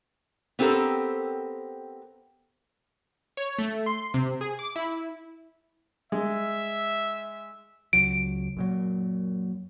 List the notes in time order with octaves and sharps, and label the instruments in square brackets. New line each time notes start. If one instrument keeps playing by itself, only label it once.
[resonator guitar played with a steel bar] B3 C4 G4 A4 A#4
[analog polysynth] C#5
A3
C6
C3
G#4
D6
E4
[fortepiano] G#3 [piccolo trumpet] E5
[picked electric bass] C#2 F#3 [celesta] D7
[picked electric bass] F#2 A#2 F#3